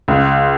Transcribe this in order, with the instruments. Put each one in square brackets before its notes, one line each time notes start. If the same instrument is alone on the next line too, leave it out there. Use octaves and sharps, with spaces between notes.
[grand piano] C#2